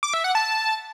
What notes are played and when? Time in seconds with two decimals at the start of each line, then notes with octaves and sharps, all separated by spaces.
0.03 D6
0.14 E5
0.24 F#5
0.35 A5